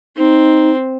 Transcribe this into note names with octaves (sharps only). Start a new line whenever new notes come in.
C4 D#4